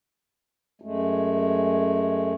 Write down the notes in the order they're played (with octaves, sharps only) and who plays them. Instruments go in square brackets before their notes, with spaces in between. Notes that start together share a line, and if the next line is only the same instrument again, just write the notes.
[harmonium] F#2 G#3 A3